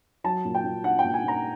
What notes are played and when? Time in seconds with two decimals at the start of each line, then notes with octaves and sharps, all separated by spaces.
0.24 F#3 A5
0.45 A#2
0.55 G5
0.64 A#2
0.84 D4 F#5
0.99 G5
1.04 A#2
1.14 G#5
1.24 A#2 A#5